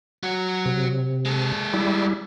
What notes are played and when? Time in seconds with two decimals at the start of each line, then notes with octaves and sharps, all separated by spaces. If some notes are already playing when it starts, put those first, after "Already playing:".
0.23 F#3 F#4
0.66 C3
1.26 G#3 A4
1.74 G3 E4